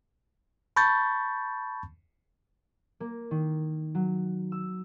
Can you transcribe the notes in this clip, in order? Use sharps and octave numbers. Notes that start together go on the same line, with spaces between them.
A5 B5 C#6 G6 A6
A#3
D#3
F#3
E6